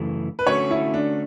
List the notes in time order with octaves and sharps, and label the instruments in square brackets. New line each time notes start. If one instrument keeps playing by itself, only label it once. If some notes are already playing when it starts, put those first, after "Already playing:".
Already playing: [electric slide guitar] F#2 C#3 E3 A3
[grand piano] B4
[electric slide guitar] D3 A3 C#4 F#4 [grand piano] C#5
[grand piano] E4
D4